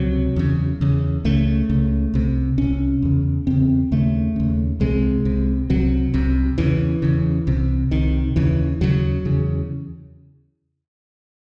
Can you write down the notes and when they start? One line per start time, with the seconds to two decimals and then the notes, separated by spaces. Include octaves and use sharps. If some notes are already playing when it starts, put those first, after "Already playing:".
Already playing: C#2 C3 F#3
0.36 E2 C#3
0.81 E2 C#3
1.25 C#2 C#3 A3
1.69 C#2 C#3
2.14 C2 C3
2.58 C2 C3 C#4
3.02 E2 C#3
3.47 E2 C#3 C4
3.92 D#2 C#3 A3
4.36 D#2 C#3
4.80 C2 C3 G#3
5.25 C2 C3
5.70 C2 C3 F#3
6.14 C2 C3
6.58 E2 C#3 E3
7.02 E2 C#3
7.47 C2 C3
7.91 C2 C3 D#3
8.36 D#2 C#3 E3
8.81 D#2 C#3 F#3
9.25 E2 C#3